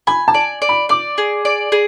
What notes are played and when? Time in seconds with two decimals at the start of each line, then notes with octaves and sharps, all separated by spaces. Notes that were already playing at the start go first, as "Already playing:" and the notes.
0.07 G#5 B5
0.28 A5
0.34 D5
0.62 D5
0.69 B5
0.89 D5 D6
1.18 G#4
1.45 D5
1.72 G#4